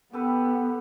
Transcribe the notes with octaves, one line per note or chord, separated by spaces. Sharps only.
B3 G4 A4 B4